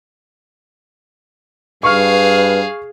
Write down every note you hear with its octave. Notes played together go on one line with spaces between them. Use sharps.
G2 G#4 B4 F5 C#6 F6